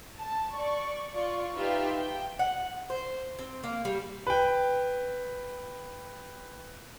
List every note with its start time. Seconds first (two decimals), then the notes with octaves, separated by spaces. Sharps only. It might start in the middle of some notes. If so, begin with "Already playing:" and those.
0.19 A5
0.54 D5 C#6
1.13 F4 D5 C#6
1.55 D#4 F4 G4 B4 E5 F5
1.98 G5
2.39 F#5
2.90 C5
3.39 C4
3.64 A#3
3.85 G3
4.27 B4 G5